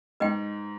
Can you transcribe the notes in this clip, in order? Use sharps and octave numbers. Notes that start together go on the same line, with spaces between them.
G#2 B4 D#5 G5